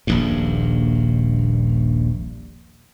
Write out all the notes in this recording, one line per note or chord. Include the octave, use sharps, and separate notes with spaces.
D#1 A#1 G2